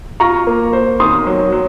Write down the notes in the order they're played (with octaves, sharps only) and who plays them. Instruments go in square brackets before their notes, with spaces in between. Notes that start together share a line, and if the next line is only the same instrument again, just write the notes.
[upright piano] F4 [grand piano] A#5 C#6
[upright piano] A#3
C5
[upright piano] D#3 [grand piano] C6 D#6
[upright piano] F#3
F#3